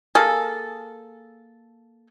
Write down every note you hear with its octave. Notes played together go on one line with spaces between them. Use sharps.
A#3 G#4 A4